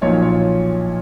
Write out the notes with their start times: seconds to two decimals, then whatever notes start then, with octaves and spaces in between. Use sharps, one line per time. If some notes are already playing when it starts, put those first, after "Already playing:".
0.01 B1 A#2 F3 C#5
0.22 C#5